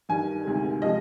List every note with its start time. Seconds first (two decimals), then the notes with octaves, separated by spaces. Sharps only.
0.09 G2 D#3 G3 G#5
0.45 D2 C3 D#3 G#3
0.82 C3 F3 G#3 D#5